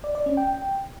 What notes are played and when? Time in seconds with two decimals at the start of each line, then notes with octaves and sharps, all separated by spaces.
0.04 D5
0.15 D5
0.26 C#4
0.37 G5